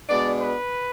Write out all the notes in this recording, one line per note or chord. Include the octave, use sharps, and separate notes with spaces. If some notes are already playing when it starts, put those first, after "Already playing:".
B2 G#3 B3 D4 D5
B4